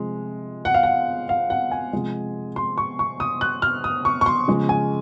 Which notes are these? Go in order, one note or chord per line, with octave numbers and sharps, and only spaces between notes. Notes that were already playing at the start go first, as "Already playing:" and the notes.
Already playing: C3 F3 G#3
F#5
F5
F#5
F5
F#5
G#5
C3 F3 G#3
C6
C#6
C#6
D#6
F#6
F6
D#6
C#6
C#6
C6
C#3 F3 G#3
G#5